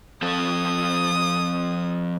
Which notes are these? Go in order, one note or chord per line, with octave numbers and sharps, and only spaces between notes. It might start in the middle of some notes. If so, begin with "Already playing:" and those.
F3 C4 A4 D#6